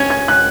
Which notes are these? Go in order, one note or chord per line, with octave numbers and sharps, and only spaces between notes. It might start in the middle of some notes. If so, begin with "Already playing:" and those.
Already playing: C#4 G#6
G#6
F#6